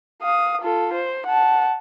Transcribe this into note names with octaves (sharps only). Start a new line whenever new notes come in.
F5 D#6
F4 A4
C5
F#5 A5